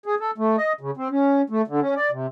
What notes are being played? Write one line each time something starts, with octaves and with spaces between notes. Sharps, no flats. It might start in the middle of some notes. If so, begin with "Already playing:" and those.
G#4
A4
A3
D#5
C#3
C4
C#4
A3
D3
C#4
D5
C3